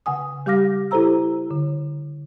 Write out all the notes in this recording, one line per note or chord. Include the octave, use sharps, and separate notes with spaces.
C#3 F#5 G#5 D#6
G3 G4 F5 D6 F6 A#6
E4 G4 A4 C5 A#5 E6
D3